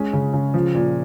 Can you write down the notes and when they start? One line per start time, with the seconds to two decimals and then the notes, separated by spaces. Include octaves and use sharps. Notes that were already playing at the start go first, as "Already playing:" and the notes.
Already playing: G#3 C#4
0.13 C#3
0.33 C#3
0.54 F3
0.74 A#2